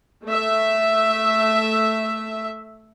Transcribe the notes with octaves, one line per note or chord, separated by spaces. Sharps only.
A3 E5